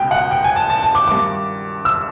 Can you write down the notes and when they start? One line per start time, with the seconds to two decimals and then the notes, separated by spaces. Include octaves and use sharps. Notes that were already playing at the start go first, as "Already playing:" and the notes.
Already playing: C#2 B2 G5
0.11 F#5
0.31 G5
0.44 G#5
0.56 A5
0.70 A5
0.83 A5
0.95 D6
1.08 G2 D#3 D6
1.85 E6